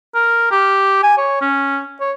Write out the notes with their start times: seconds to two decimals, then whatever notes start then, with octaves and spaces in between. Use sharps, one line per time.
0.14 A#4
0.51 G4
1.03 G#5
1.18 C#5
1.41 C#4
2.00 C#5